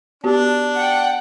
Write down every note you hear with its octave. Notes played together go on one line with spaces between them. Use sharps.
B3 D4 F#4 G4
F#5 G5